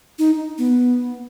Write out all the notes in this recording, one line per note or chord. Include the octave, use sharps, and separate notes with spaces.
D#4
B3